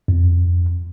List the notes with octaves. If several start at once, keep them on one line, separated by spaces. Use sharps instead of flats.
F2